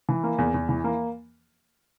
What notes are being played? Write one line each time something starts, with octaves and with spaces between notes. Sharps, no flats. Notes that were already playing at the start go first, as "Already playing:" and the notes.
E3
A#3
E2
E2
E3
A#3